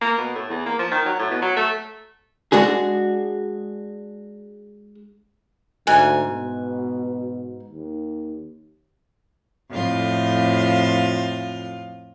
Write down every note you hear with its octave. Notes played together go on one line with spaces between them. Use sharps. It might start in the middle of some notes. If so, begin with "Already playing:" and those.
A#3
B2
A2
E2
A#3
F3
D#3
F#3
A2
B2
F#3
A3
G#3 D4 F#4 G#4
D2 G#2 G#5
B2
D#2
F2 A2 F4